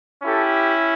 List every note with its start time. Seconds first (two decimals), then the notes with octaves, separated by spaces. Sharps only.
0.24 C#4 E4 G4 A4